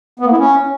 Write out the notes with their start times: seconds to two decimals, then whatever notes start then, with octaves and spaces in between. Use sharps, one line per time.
0.19 B3
0.26 A#3
0.32 E4
0.38 C#4